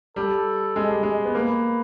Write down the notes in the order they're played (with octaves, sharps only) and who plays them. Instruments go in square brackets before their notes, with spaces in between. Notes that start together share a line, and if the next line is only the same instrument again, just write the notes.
[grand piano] G3 [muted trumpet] A4
[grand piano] G#3
G3
G#3
B3
[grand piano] A#3 [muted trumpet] B4